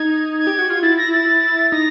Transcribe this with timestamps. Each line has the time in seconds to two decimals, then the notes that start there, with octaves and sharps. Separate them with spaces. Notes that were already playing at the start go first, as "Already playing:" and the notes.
Already playing: D#4 G#6
0.39 G#6
0.47 G4
0.59 F#4
0.70 F4
0.82 E4 A6
0.98 A#6
1.12 A6
1.72 D#4 A#6